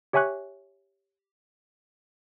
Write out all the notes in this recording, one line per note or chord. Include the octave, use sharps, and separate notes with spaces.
G4 C#5 E5 G#5 C#6 F#6